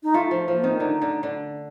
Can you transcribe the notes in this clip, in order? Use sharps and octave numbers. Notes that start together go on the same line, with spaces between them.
D#4
A3 F4
F3 D#4
F3
A#3
D#3 C4
D4
D3 D#4
D3
D3